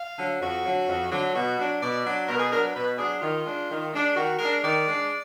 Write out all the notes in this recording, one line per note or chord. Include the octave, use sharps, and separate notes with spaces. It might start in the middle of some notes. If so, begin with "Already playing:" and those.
Already playing: F5
D3 F#3
F2 F#4
D3 F#3
F2
D3 F#3
B2 F#4
F#3 D4
B2 D5
F#3 D4
B2 A#4
G#4
F#3 D4 A#4
B4
B2 B4
F#3 D4 G#4
D#3 F4
G#3 D4
D#3
G#3 D4
D#3 F#4
G#3 D4 A#4
D#3 D5
G#3 D4